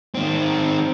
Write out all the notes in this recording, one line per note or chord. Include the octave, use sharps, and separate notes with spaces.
D#3 C4